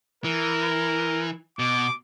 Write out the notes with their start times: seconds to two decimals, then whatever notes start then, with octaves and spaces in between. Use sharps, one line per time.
0.24 E3 A#4
1.59 B2 D6